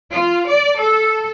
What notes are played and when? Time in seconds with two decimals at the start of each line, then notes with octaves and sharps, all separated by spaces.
0.11 F4
0.47 D5
0.78 A4